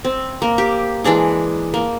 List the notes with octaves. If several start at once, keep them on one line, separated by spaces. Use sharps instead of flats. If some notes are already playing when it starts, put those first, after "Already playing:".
C4
A#3
G4
E3 G#3 D4 G#4
A#3